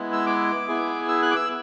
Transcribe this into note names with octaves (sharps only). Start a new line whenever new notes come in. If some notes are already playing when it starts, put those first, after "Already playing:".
Already playing: G#3 B3 E4
E6
D6
B3 E4 G#4
E6
F#6
D6
E6